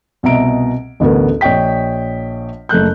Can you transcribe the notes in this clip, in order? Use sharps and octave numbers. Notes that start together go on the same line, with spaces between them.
C2 B2 D#5 E5 A#5 D7
A1 D2 B3 A#4
A#1 C#5 D#5 G5 B6
F#1 A3 F#6 G6